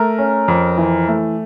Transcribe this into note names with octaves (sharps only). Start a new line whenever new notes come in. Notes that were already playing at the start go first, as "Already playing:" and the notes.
Already playing: A3 A#4
C#4
F2
E3
A3